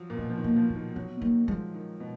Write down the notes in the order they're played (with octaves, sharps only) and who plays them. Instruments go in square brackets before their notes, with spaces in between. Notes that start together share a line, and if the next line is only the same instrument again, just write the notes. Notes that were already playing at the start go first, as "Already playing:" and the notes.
Already playing: [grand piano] F3 F#3
A#2
[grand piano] B2 [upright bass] A#3
[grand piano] F3
D#3
[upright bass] A#3
[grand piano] F3
[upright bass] G#3
[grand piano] D#3
[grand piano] F#3 [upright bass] B3
[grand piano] D#3 [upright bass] A#3
[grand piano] F3 [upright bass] G#3
[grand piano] D#3
B2